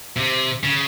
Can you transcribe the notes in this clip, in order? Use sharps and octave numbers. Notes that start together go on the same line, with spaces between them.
C3
C#3